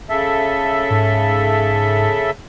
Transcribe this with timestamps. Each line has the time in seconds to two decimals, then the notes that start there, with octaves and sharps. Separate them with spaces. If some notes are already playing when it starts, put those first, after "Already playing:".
0.10 C#3 A4 E5
0.90 G#2